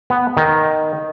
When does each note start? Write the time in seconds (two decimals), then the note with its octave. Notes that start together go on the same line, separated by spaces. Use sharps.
0.10 B3
0.37 D#3